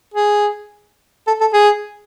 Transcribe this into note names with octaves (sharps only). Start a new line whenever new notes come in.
G#4
A4
A4
G#4